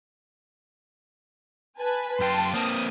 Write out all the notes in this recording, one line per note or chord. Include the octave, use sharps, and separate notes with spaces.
B4 G#5 A5
F#2 G5 A5 C6
A#3 C4 D#6